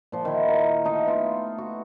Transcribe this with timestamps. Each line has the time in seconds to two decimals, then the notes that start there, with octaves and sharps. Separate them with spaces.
0.12 A#2 F3
0.25 D#3 E4
0.48 A#4
0.85 A3 D#4 F5
1.06 B3 D#4 F4
1.58 F#4